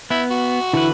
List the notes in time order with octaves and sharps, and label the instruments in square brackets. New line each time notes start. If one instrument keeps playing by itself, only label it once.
[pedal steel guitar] B3 [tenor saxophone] E4
[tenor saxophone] F#4
[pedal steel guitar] D3 E3 B4 [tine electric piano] E4